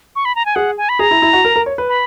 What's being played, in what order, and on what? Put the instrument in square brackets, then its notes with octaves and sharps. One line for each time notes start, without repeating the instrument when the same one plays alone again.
[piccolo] C#6
B5
A#5
G#5
[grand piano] G#4 [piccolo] F#5
[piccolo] G#5
B5
[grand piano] G#4 [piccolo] A#5
[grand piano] E4
E4
F#4
A#4
A#4
C#5
B4
[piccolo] B5